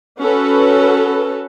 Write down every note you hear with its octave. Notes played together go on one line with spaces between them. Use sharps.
C#4 F#4 A4 B4